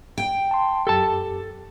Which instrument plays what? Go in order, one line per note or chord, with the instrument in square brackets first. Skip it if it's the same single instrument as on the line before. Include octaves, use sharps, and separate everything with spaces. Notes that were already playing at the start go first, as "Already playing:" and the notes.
[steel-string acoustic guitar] G5
[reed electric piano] A5 C6
[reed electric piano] F#2 G4 [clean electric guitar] A4 A5